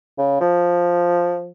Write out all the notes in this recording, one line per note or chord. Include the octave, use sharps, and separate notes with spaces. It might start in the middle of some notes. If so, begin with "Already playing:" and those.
C#3
F3